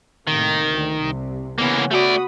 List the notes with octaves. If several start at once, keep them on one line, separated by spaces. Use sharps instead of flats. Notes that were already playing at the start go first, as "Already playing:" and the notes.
A2 C3 D#3 A#3
D2
C2 C3
C#3 E3 A#3 B3 C#4
A3 F#4 D5 B5 D#6